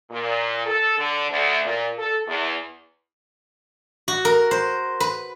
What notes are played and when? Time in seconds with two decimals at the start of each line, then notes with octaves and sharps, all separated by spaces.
0.10 A#2
0.65 A4
0.98 D3
1.30 D2
1.64 A#2
1.97 A4
2.27 E2
4.08 F#4
4.25 A#4
4.51 C5
5.00 B4